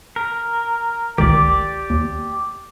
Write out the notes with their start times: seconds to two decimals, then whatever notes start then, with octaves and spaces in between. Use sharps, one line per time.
0.16 A#4
1.18 G1 C#2 D#3 G4 D5
1.90 D#2